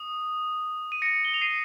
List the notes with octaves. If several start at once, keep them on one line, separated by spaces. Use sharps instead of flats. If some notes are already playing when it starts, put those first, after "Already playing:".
Already playing: D#6
D#7
A#6 C#7
G7
F7
C7 D#7